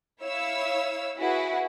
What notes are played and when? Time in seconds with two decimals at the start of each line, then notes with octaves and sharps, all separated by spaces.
0.21 E4 C#5 F5 E6
1.17 E4 F#4 G#4 B4